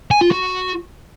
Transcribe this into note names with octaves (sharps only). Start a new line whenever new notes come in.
G#5
F4
F#4